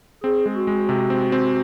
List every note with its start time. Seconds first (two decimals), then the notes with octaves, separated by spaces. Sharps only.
0.23 C4 G#4
0.46 G#3
0.56 F#4
0.67 G#3
0.89 C3
1.10 C4
1.32 C4